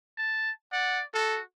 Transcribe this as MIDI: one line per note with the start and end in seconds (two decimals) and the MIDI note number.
0.17 0.51 81
0.73 1.05 74
0.73 1.00 78
1.14 1.42 66
1.14 1.39 69